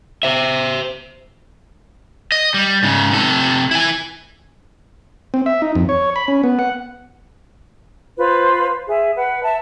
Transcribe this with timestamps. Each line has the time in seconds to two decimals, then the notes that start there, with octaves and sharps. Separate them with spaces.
0.23 C5 E5
2.32 D#5
2.54 G3
2.83 G#2 C#3
3.11 C3 A4
3.71 E4 G#5
5.34 C4
5.46 E5
5.62 D#4
5.75 F2
5.89 C#5
6.16 B5
6.28 C#4
6.43 B3
6.59 F#5
8.17 F4 B4 C5
8.87 G#4 E5
9.16 B4 F#5
9.43 E5 A5